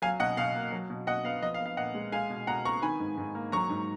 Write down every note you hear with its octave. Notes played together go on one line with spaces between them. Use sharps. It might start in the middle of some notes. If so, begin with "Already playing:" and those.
F#3 F5 G#5
B2 D#5 F#5
B2 F5
A#3
F#3
B2
B2 D#5 F#5
B3 F5
F3 D#5
F5
B3
F5
A#2 D#5 F#5
G#3
G#3 F5 G#5
B2
B2 F#5 A#5
B3 A#5 C#6
D#3 G#5 B5
G#2
G#2
A#3
F#3 A#5 C#6
G#2